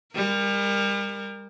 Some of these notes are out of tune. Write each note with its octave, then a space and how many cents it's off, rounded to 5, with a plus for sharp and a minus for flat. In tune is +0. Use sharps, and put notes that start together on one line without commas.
G3 +40 A#4 +0